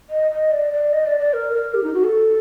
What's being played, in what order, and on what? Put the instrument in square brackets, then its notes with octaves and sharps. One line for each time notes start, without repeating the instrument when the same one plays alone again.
[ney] D#5
D#5
D5
D5
D#5
D5
D5
A#4
A#4
G4
D#4
F#4
A4